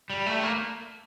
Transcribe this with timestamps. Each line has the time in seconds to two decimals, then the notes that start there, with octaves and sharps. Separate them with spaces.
0.10 G3
0.26 A3
0.43 A#3